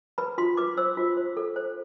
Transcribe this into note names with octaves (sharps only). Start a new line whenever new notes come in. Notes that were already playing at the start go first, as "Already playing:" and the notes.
B4 B5
F4 C6
B4 D6
C5 E6
F4
C5
A4
C5